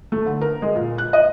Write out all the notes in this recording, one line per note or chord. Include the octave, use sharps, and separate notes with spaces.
A3
D3
A#4
G#3
A#2
F#6
D#5